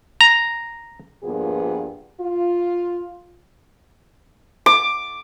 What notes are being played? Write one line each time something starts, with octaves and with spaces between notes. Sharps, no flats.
A#5
G2 A#2 F3 A#3 B3 G#4
F4
D6